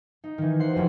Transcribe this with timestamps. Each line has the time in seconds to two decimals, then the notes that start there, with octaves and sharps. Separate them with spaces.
0.24 D#4
0.38 D#3 E3
0.60 C5 F#5 C7
0.73 F1 F2 C#4 F#4